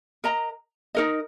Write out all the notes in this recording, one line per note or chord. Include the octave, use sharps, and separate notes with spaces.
A#4 D#5 A#5
D#4 A#4 D#5